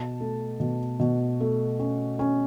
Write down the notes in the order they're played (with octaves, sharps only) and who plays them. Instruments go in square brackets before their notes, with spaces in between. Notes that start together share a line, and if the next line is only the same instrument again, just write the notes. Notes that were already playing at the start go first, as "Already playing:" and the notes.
Already playing: [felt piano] B2 A5
A3
B2
B2
A3
C#4
C#4